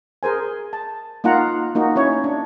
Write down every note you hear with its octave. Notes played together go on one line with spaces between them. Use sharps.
G#4 A#4 C5 G#5
A5
A#3 D#4 F4 F#5 A#5
A#3 D#4 F#4
C#4 E4 C#5
D4